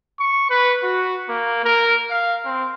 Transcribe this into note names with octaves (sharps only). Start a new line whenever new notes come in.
C#6
B4
F#4
A#3
A#4
F5
C4